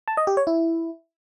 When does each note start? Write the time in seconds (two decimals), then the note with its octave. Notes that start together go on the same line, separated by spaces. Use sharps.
0.08 A5
0.17 D#5
0.27 G4
0.37 C#5
0.47 E4